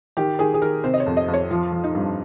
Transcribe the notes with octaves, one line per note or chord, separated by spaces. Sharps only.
D#3 G4
D#3 G#4
G#4
D#3 A#4
C3 C5
D#5
C#5
F2
D#5
F2
C#5
F3 F4
F3
D#4
G2